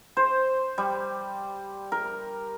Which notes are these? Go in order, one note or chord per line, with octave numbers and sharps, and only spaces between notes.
C5
G3
A#4